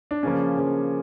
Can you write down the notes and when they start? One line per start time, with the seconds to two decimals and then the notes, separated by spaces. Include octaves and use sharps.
0.11 D4
0.23 C#3 F3 A#3 C#4
0.57 C#3 F3 A#3